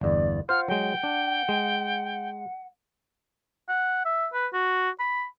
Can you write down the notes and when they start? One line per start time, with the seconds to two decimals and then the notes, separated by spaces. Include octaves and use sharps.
0.01 G1 E2 D5
0.49 F4 C5 F#5 F6
0.68 F#3 G#3 G5
1.03 D4
1.49 G#3
3.69 F#5
4.05 E5
4.33 B4
4.53 F#4
5.00 B5